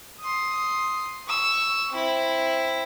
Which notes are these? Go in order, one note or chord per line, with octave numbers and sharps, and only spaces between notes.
C6 D#6
C#6 E6
C4 E4